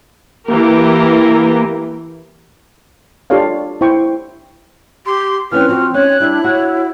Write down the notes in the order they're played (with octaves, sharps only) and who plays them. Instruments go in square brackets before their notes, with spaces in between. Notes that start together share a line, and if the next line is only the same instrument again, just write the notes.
[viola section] E3 G4 A#4 [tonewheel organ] A#3
[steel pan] D4 F4 G4 A4 C#5 F5
E4 C5 G5 C#6
[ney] G4 [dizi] C6
[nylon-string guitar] E3 C#4 G5 [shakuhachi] C4 [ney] B4 [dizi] F6
[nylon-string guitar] F3 [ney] F#4
[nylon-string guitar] C#4 D#4 [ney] C#5 [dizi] F#6
[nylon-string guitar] G3 [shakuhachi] D4 [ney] E4
[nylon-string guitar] F#4 [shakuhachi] C#5